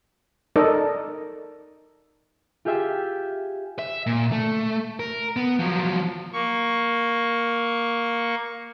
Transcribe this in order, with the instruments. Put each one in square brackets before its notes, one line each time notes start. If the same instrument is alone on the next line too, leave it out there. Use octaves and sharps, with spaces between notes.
[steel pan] D#4 A4 A#4 D5 D#5
[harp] F4 G4 G#4 E5 G5
[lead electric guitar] E5
A#2
A3
A#4
B3
F3 F#3
[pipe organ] A#3 C#6